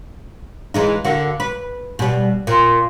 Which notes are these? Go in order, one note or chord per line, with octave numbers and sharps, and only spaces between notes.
E3 G#3 D#4
D3 A#3 F#4
B4
B2 G3
A#2